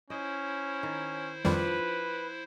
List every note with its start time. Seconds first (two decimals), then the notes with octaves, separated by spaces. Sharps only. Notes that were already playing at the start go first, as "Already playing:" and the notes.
0.10 C#4 E4 C5 D#5
0.83 D#3
1.45 F2 D#3 F3 G3 D4 B4